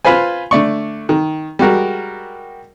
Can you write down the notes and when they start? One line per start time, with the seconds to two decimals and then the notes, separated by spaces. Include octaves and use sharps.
0.05 F4 B4 C5 G#5
0.51 D3 A3 D5 C#6
1.09 D#3
1.59 G3 G#3 F#4 A#4